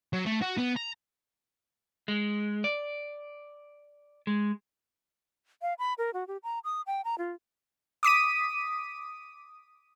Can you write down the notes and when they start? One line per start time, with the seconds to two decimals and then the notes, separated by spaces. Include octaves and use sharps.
0.13 F#3
0.26 A3
0.41 F#4
0.57 B3
0.76 A#5
2.08 G#3
2.64 D5
4.27 G#3
5.62 F5
5.79 B5
5.98 A#4
6.14 F#4
6.28 G4
6.43 A#5
6.64 D#6
6.87 G5
7.05 A#5
7.18 F4
8.03 D6 D#6 B6 D#7